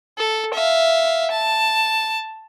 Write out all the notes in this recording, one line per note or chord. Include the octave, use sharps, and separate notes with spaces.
A4
E5 F5
A5